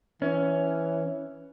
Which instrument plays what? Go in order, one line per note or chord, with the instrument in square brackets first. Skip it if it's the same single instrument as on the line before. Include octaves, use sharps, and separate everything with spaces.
[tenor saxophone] E3 [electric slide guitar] C#4